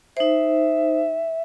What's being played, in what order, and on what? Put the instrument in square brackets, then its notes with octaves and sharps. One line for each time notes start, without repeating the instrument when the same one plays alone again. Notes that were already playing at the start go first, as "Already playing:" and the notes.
[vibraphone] D#4 C5 [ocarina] E5